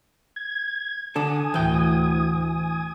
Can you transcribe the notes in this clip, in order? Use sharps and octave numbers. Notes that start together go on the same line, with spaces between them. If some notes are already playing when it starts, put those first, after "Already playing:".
G#6
D3 D4 A4 G#5 D#6
D2 A2 E3 G5